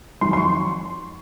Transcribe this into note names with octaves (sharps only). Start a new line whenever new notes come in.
F2 D#3 F#3 C6
C6
C#6